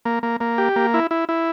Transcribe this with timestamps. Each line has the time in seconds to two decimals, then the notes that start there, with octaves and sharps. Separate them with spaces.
0.05 A#3
0.23 A#3
0.40 A#3
0.58 G4
0.76 A#3
0.94 E4
1.11 E4
1.29 E4